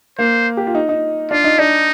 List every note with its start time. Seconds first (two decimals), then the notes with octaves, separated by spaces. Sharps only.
0.18 A#3 C5
0.57 G4
0.67 F4
0.75 D#4
0.89 D#4
1.31 D4 F4
1.44 D#4
1.59 D4 D#4